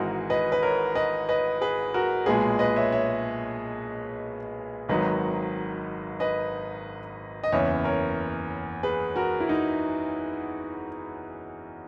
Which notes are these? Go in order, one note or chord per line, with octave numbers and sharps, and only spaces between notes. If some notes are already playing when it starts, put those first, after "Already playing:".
Already playing: G#1 G#2 E3 G#3 F#4 A#4
B4 D#5
B4
A#4 C#5
B4 D#5
B4 D#5
G#4 B4
F#4 A#4
B1 A#2 G#3 G#4 B4
B4 D#5
C#5 E5
C#5 E5
G#1 G#2 D#3 F#3 B4 D#5
B4 D#5
D#5
F#1 E2 C#3 C#5 E5
A#4 C#5
G#4 B4
F#4 A#4
E4
D#4